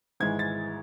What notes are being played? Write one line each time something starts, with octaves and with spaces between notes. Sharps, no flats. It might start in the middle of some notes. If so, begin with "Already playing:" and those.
G#1 G#2 E3 G#3 G#6
A6